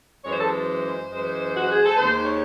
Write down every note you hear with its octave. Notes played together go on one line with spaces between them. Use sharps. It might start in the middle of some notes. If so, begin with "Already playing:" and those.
F#2 E3 G#3 C#5
C5
A4
C5
F#2 E3 G#3
F#4
G#4
A4
D#2 D#3 G#3 C5
C#5